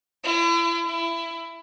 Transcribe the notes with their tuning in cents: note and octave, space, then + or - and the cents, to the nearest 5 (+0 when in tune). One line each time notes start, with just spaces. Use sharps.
E4 +40
E4 +20